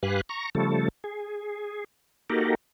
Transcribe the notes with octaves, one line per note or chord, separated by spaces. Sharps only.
G2 G4 B4 F5 G#5 F#6
A#5 C#6
C#3 F3 G3 A3 A4
G#4
A#3 D#4 F#4 G4 A4 A#4